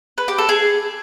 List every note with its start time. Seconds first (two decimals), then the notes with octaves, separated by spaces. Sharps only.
0.18 B4
0.28 G4
0.38 A4
0.49 G#4